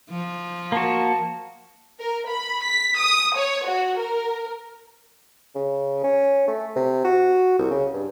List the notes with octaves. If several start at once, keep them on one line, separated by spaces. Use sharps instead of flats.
F3
A#3 F#4 A5
A#4
B5
B6
D#6
C#5
F#4
A#4
C#3
C#4
A3
C3
F#4
C2
C#3
G2